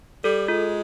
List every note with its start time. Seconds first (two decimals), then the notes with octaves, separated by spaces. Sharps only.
0.24 G3 A4
0.48 G#3 F4